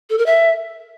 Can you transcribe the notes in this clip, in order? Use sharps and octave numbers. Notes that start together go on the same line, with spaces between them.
A4
A#4
E5